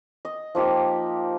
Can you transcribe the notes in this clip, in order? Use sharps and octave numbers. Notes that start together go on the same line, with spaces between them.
D#5
F3 A#3 D#4 G4